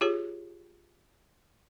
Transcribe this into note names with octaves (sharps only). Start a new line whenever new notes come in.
F4 G4 G#4 C#5